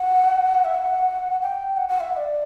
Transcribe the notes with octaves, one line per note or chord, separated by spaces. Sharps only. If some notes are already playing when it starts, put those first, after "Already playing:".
Already playing: F#5
E5
F#5
G5
F#5
F#5
E5
E5
D5